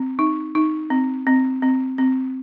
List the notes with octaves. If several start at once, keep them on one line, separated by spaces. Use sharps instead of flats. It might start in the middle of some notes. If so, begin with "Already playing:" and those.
Already playing: C4
D#4
D#4
C4
C4
C4
C4